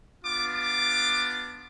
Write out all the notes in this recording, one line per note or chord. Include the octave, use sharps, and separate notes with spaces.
B3 D4 F4 D6
D6